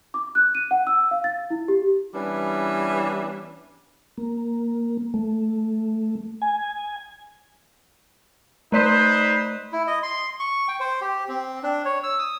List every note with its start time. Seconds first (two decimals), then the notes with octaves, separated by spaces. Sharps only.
0.14 D6
0.35 F#6
0.55 D#7
0.71 F#5
0.87 E6
1.11 F5
1.24 A6
1.50 E4
1.68 G4
2.14 E3 G3 B3 C#4 D4
4.18 A#3
5.14 A3
6.42 G#5
8.72 A3 D#4 B4 C5 D5 B6
9.72 E4
9.87 D#5
10.03 C6
10.40 C#6
10.68 G5
10.80 C5
11.01 G4
11.28 C4
11.63 D4
11.85 C#5
12.04 E6
12.19 D#6